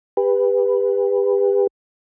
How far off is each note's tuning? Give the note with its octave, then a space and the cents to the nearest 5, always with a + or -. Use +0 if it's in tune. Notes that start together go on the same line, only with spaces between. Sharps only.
G4 +35 B4 +0